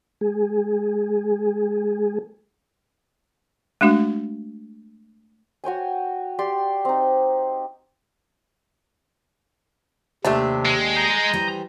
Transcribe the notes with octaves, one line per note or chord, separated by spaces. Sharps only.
G#3 G#4
G#3 A3 D4 F#4
F#4 C#5 G5 G#5
G4 D5 C6
C4 D#4
D#2 C3 A3 D4 G4 E5
G#3
A#5 D#6 G6
E3 G3 C5